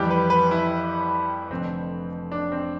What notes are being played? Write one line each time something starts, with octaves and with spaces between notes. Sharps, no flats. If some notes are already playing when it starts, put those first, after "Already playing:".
Already playing: F2 E3 G3 G4
B4
B4
E4
F1 F2 D3 C4
D4
C4